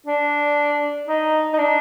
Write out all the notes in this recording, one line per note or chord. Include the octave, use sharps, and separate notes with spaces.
D4
D#4
D#4
D4